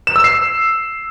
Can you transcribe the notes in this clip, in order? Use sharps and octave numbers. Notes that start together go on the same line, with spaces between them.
E7
E6
C7